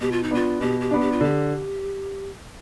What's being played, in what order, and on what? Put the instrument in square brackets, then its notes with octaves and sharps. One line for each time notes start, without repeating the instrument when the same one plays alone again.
[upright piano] B2 [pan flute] G4
[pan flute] F4
D#4
[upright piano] B3 D4 [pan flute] F4
[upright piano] B2 [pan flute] G4
[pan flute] G4
[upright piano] B3 D4
[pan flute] G4
F4
[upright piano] D3 [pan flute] G4